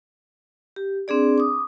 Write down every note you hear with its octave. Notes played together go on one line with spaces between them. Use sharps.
G4
C4 D4 G#4 D5
D6 D#6